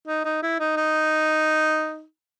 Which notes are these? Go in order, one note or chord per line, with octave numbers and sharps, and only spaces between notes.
D#4
D#4
E4
D#4
D#4